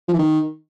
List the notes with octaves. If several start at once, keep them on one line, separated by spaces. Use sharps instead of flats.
F3
E3
D#3